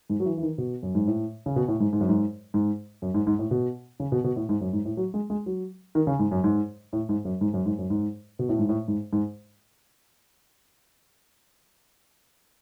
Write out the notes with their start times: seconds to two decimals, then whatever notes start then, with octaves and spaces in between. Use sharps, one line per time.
0.10 G#2
0.20 F#3
0.26 E3
0.37 E3
0.42 D#3
0.58 B2
0.83 F#2
0.95 G#2
1.07 A2
1.46 C#3
1.56 B2
1.68 A2
1.80 G#2
1.93 G#2
2.00 F#2
2.09 G#2
2.54 G#2
3.02 F#2
3.14 G#2
3.27 G#2
3.39 A2
3.51 B2
4.00 C#3
4.12 B2
4.24 B2
4.36 A2
4.49 G#2
4.61 F#2
4.73 G#2
4.85 A2
4.97 F#3
5.14 G#3
5.30 G#3
5.46 F#3
5.95 D#3
6.07 C#3
6.19 G#2
6.31 F#2
6.44 G#2
6.93 A2
7.09 G#2
7.25 F#2
7.41 G#2
7.54 F#2
7.66 G#2
7.78 F#2
7.90 G#2
8.39 B2
8.49 A2
8.59 G#2
8.69 A2
8.88 G#2
9.13 G#2